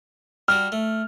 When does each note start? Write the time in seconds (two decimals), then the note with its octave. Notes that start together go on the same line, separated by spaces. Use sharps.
0.48 G3 D4 F#4 F6
0.72 A3